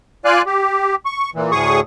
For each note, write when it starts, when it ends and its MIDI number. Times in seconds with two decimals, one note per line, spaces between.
0.25 0.42 65
0.25 0.42 74
0.25 0.42 77
0.25 0.42 80
0.25 0.42 90
0.46 0.95 67
1.06 1.30 85
1.35 1.52 46
1.35 1.52 52
1.52 1.80 38
1.52 1.80 45
1.52 1.80 68
1.52 1.80 85
1.52 1.80 87